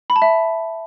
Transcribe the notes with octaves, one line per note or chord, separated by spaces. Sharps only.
B5
A5
E5